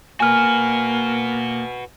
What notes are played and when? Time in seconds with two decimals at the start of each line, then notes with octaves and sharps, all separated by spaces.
0.20 A#3 F#4 B4 G#5 F6